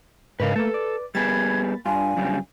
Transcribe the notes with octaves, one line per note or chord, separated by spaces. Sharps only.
G#2 C#3 A#4 B4 D#5 F5
A3 A#3 A4 B4
D5
G3 A#3 B3 G#4 B5 G#6 A6
G2 D4 F4 G#5
F#2 C#3 G3